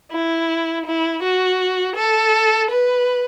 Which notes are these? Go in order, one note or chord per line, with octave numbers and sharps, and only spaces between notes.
E4
E4
F#4
A4
B4